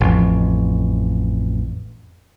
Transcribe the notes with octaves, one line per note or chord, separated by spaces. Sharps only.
A1 F2